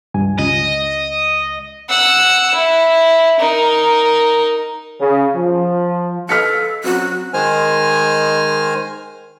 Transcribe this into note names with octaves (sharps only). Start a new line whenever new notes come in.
C#2 G2 G#5
C#2 D#5
F#5 E6
E4
D#4 A#4
C#3
F3
A4 B4 D#5 F5 F6 B6 C#7
F#3 C4 C#4 F#4
D#3 G#3 C5 G#5 F6